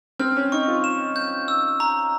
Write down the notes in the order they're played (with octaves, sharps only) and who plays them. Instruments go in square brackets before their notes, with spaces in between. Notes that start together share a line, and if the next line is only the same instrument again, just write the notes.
[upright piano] C4 [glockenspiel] F6
[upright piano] C#4
[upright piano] D#4 [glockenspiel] C#6
[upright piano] F4
[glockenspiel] E7
G6
E6
A#5